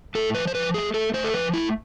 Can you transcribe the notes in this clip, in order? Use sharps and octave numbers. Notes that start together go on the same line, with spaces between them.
A2 A4
F3 B4
C5
F3 B4
A3 G#4
A3 A4
A3 C5
A4
F3 B4
A3 E4